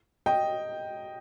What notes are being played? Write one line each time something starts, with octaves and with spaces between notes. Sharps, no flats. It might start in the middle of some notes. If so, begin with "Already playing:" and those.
D#5 G5